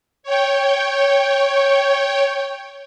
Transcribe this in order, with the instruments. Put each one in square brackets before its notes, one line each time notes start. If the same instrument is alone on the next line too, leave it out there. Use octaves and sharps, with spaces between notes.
[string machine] C#5 G5